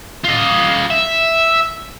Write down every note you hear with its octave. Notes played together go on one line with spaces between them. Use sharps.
F4 D#5
E5